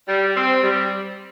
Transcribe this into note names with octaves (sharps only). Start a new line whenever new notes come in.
G3
C4
G3